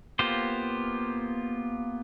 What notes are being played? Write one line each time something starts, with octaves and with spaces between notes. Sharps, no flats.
A#3 B3 F4 G4 C5